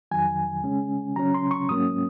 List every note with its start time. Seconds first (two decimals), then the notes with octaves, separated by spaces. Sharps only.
0.11 F2 D#3 F#3 G#5
0.63 C#3 G#3 C#4
1.16 C#3 F#3 C#4 A#5
1.34 C6
1.51 C#6
1.69 G#2 F#3 A#3 C#4 D#6